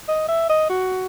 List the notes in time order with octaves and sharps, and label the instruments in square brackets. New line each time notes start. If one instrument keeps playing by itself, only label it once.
[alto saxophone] D#5
E5
D#5
F#4